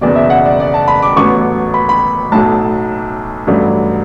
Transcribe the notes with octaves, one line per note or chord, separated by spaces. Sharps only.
F#1 E2 B2 D5
E5
F#5
D5
D5
A5
B5
D6
A1 A2 F#3 B3 C#6
B5
B5
B1 A2 F#3 A3 A5
A1 G2 F#3 A3